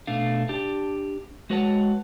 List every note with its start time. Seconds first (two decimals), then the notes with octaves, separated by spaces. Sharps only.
0.07 B2 A3 D4 F5
0.49 D4 G4 A5
1.50 G#3 F#4 B4 C#5 F#5 A5